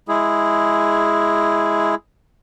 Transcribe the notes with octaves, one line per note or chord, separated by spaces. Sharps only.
G#3 E4 G#4